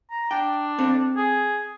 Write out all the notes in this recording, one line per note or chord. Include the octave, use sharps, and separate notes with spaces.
A#5
D4 G5
C4 A4
G#4